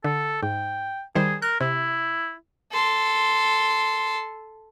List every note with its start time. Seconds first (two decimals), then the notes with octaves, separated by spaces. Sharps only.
0.05 D3 A4
0.43 G#2 G5
1.15 D#3 G3 G#4 C5
1.42 A#4 F#6
1.61 C3 E4
2.72 A4 C6